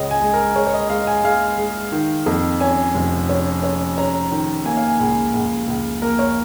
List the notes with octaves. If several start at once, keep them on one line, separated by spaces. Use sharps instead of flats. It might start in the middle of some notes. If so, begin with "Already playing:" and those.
Already playing: C#2 C#3 C#4 D#5
G#5
G#3
A#4
G#3 C#5
C#5
D#5
G#3 F5
G#5
G#3 F5
G#3
D#3
F2
C#4 G#5
F1
C#4
C#4
C#4 A#5
D#3
A#3 G#5
F5
G#5
C#2
C#2
C#2
A#3 A#4
C#5